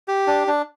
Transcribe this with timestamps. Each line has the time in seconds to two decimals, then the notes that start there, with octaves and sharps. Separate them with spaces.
0.08 G4
0.27 D4
0.47 D4